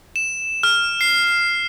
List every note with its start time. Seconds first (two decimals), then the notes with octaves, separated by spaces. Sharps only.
0.16 E7
0.63 F6
1.01 C7